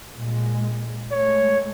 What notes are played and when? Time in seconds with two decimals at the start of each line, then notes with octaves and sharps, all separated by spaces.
0.16 A#2 G#3
1.11 G#3 A3 C#5